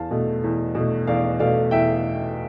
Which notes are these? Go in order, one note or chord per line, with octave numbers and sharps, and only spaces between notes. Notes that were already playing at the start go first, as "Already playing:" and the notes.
Already playing: E2 F5 A5
B2 A3
E2
B2 A3
E2 D5 F5
B2 A3 D5 F5
E2 E5 G5